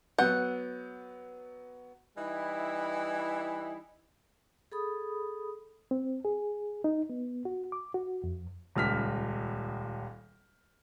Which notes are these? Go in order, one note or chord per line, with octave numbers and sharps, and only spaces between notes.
F#3 B3 F#5 G6
E3 G3 D#4 E4
G#4 A4 B5 D#6
C4
G#4
D#4
B3
F#4
D6
F#4
F2
D#1 C#2 F6 B6